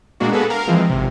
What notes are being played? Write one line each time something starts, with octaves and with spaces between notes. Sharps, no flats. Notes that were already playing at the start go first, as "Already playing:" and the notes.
A#2 G#3 A#3 D4 F#4
A#3 B3 F#4 G#4 A4 B4
A#4 F5
E3 F3 G#3 C4
G#1 C3